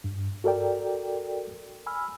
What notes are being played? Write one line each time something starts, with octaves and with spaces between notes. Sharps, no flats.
G2
F#4 A4 A#4 D5 G5
G#5 B5 E6 F6